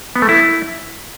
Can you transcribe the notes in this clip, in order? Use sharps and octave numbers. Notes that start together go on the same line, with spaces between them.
B3
A3
E4